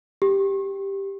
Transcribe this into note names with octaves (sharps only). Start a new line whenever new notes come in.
G4